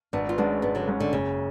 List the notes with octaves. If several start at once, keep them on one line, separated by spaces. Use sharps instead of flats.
G#1 B3 D4
F4
G#2 G#3 B3 C#4 D4
G#1 B3 D4
D3 F#3
G#2 G#3 C#4
D3
F#1 C#3